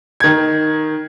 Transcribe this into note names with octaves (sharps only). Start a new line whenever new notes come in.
D#3 G#6